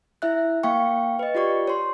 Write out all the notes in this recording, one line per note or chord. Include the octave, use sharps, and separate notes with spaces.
E4 E5 F#6
A#3 F5 G5 C#6
B4 D#5
F4 G4 D5 C#6
C#5 C6